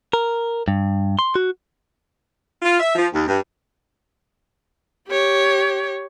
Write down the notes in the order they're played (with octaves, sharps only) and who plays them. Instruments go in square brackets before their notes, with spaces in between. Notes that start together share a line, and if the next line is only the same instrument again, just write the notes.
[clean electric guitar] A#4
G2
C6
F#4
[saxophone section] F4
E5
F3
D#2
G2
[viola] G4 C#5